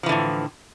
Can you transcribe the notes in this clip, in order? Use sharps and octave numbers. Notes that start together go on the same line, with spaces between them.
A2 D3 E3 F3